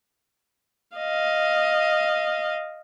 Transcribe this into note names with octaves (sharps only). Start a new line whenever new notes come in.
D#5 F5